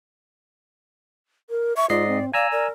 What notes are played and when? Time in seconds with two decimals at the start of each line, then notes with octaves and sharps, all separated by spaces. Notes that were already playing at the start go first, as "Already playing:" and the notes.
1.50 A#4
1.77 E5 C#6
1.90 G#2 F4 D5 D#5 C7
2.08 C4
2.33 D5 F5 G#5 A#5 E6
2.52 A#4 D5